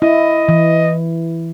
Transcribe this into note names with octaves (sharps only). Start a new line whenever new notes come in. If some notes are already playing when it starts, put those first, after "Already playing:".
E4 D#5
E3